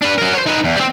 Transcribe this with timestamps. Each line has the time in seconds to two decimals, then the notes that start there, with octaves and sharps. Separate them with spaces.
0.02 D4 B4
0.18 F#3 A#4
0.34 C5 C#5
0.46 D#4 B4
0.64 E2
0.76 G3 C4